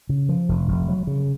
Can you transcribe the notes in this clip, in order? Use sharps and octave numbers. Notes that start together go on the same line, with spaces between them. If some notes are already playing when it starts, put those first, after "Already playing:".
C#3
F3
F1
F1
F#3
C#3